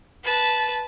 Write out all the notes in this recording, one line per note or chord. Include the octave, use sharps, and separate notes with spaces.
B4 A5